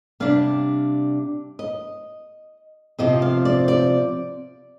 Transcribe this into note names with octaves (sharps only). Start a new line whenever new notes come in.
C3 G3 D4 F5
D#5
C3 F3 C4 D#5
F5
D5
D5